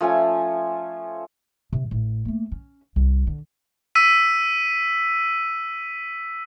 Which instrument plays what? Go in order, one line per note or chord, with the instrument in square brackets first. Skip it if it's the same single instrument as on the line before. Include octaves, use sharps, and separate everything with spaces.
[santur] F3 A3 C#4 G#5
[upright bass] C3
A1
A3 A#3
C#4
C2
D3
[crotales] E6 B6 D#7